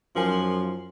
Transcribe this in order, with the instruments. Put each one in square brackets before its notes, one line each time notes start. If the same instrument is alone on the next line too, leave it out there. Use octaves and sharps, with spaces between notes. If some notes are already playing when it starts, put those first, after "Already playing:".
[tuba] F#2 [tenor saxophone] F3 [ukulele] D#4 A#4 G#5